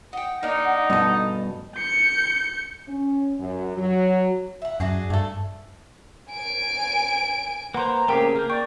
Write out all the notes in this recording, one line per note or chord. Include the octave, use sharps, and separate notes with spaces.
D#4 F#5 G5
A#3 D4 D#4
G2 B2 A4 D#5
G6 C#7
C#4
F#2
F#3
E5 F#5
F#2 D4 F#4 G#4
G2 A3 A4
G#5 D7
A#3 B4 C5 F#5 A#5 C6
C#3 A3 A#3 C4 G4 G#4 A#4 G5
A#3 F6 G6
D5 G5 C#6